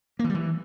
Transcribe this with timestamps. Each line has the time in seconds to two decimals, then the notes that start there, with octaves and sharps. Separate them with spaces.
0.19 A#3
0.24 E3
0.29 G3
0.35 E3